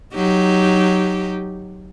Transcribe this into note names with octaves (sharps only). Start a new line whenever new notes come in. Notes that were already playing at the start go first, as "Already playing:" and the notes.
F#3 D#4 G4